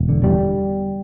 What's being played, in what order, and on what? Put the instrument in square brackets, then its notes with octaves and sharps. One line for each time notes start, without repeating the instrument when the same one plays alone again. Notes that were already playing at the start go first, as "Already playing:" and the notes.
Already playing: [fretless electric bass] E1
D3
E2 G3